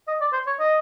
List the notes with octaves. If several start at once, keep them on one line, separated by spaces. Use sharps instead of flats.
D#5
D5
C5
C#5
D#5